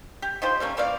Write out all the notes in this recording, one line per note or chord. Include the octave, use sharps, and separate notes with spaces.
G4
D#4 F4 G4 C5
G3 A3 A#3 C#4
E3 A#3 D5 F5